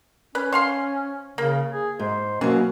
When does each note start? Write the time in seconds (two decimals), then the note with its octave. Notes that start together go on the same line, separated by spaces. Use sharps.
0.35 C#4 B4
0.53 C5 F5 C6
1.38 C#3 A#3
1.70 G#4
1.99 G#2 C5
2.41 B2 E3 F#3 A#3 C#4